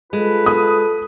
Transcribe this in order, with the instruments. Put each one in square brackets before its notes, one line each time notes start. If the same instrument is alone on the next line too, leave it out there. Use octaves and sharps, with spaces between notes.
[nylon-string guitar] G#3 [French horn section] F4 A4 [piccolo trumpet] B4
[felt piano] D#6